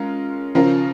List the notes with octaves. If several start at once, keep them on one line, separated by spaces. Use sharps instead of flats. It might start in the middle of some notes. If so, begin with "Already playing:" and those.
Already playing: G#3 C#4 F4 A#4
C#3 F3 C#4 F4 A#4